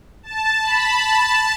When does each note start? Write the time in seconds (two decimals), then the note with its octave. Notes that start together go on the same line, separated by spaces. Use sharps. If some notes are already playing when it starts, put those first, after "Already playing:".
0.23 A5
0.62 B5
1.04 A5